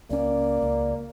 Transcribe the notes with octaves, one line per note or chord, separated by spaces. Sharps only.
C#2 A#3 C#4 D5
C#2